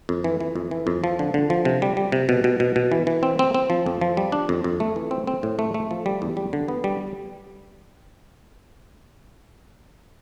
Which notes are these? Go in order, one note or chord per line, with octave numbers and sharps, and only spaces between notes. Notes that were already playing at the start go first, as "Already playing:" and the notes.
F2
E3
E3
F2
E3
F2
F3
D3
D3
F3
C3
G3
G3
C3
B2
B2
B2
B2
E3
E3
C4
C4
C4
F3
F2
F3
G3
D4
F2
F2
A3
E3
C4
C4
A2
A3
A3
F3
G3
E2
G3
D3
B3
G3